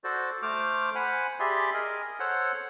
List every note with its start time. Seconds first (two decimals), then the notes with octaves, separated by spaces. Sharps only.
0.04 F#4 A4 C5 D5
0.42 A3 C5 D6 F6
0.95 C5 F#5 G#5 B5
1.40 G4 G#4 D5 E5 B5 C6
1.74 G#4 A#4 D#5
2.20 A4 C5 C#5 F#5